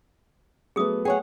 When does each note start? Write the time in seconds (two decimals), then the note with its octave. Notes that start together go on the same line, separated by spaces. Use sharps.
0.76 F#3 A3 B3 G#4 D#6
1.05 G#4 C#5 F#5 G5